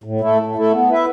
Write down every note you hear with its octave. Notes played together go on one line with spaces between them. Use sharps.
A2
A3 E4 A4
A2
A3 E4 A4
B3
E4 B4 E5